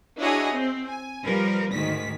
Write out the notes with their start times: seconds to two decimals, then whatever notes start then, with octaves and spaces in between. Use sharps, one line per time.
0.20 D4 E4 F#4 G#4 C#5 D#5
0.55 C4
0.87 G#5
1.24 F3 G3 A#4 B4
1.72 D2 G#2 D#3 B6